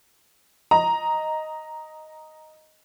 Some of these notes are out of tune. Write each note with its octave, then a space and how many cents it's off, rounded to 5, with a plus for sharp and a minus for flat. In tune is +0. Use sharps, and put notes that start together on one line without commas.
D#5 +0 A#5 +0